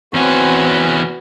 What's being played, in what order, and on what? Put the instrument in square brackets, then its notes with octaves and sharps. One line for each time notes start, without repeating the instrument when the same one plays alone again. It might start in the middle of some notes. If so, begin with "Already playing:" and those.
[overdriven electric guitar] E2 C#4 [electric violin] C4 [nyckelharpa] F#4 B4